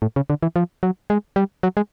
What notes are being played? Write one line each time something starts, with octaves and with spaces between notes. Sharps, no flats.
A2
C#3
D3
E3
F3
F#3
G#3
G3
F#3
G#3